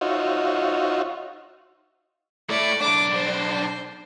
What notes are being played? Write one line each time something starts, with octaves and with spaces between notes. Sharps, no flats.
D#4 F4 F#4 C5 C#5 E5
A3 E4 D5
B1 D4 D6
C5